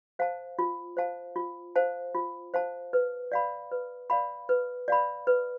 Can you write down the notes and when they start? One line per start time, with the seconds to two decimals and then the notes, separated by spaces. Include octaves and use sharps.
0.19 C5 F5 A5
0.59 F4
0.97 C5 F5 A5
1.36 F4
1.76 C5 F5 A5
2.15 F4
2.54 C5 F5 A5
2.93 B4
3.32 D5 F5 B5
3.71 B4
4.10 D5 F5 B5
4.49 B4
4.88 D5 F5 B5
5.27 B4